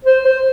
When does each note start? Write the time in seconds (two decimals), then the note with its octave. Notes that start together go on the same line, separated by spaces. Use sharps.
0.05 C5
0.25 C5